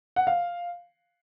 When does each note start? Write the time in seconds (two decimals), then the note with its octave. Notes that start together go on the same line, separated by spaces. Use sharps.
0.16 F#5
0.27 F5